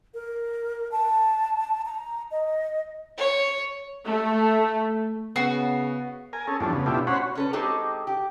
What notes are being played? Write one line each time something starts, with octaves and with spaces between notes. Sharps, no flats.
A#4
A5
A#5
D#5
C#5
A3
C#3 B3 F#4 C7
A#4 G#5
C#4 G#4 A4
E2 G2 F3 A3 D4
C#3 B3
B2 A3 D4 E4 F4 G4
C#4 F#4 C5 C#5 F#5 B5
C#4 A4 B4
G#3 C4 D#4 F#4 G4 A4
G4